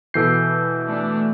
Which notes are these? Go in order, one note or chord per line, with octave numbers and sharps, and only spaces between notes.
B2 E3 A4 G6 C7
A3 D4